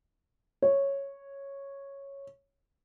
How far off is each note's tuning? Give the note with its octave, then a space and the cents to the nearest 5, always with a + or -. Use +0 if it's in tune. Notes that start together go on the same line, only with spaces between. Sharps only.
C#5 -5